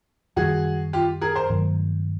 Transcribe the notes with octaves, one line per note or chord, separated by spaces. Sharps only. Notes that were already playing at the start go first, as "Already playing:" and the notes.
F#2 D#3 G3 F#4 G#4
F4 G4
G#4 A#4
A#4 C5
G2 D#3 F#3 A3